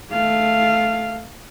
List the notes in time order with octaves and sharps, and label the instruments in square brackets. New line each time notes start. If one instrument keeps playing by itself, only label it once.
[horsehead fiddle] A3 F5